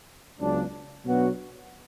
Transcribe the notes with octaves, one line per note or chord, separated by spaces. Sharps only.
C#2 C#3 F#3 B3 D4
B2 F#3 B3 D4 F#4